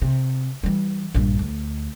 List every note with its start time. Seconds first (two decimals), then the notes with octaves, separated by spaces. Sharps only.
0.02 C3
0.63 E3 G3
1.14 A#1 G2
1.39 D2